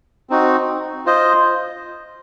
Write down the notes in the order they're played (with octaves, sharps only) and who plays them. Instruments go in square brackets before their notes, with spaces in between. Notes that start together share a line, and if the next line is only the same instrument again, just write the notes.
[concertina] C4 D#4 F#4
F4 C5 D#5